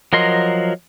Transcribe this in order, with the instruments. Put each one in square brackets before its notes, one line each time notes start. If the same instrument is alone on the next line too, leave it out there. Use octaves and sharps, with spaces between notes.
[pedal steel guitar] F3 F#3 A#4 D#5 C6